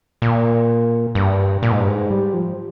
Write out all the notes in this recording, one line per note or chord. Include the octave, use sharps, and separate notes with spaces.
A#2
G2
A#2
G#2
G2
G#2
G3
F3